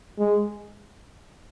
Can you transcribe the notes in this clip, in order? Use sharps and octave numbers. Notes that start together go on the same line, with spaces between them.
G#3